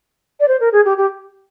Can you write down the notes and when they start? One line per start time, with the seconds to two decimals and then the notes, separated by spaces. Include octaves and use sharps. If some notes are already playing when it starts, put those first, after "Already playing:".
0.40 D5
0.48 C5
0.60 A#4
0.72 G#4
0.85 G4
0.98 G4